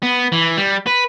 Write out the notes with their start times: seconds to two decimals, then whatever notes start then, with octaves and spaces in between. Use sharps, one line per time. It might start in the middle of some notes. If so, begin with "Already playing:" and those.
0.03 B3
0.32 E3
0.57 G3
0.87 B4